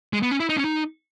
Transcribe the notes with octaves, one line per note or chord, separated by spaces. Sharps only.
G#3
B3
C#4
E4
D#4
C#4
D#4